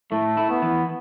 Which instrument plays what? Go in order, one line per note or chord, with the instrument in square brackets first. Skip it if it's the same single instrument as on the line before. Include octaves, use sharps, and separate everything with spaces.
[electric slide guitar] A2 [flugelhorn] A3
[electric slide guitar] E4
[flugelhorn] B3
[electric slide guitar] E3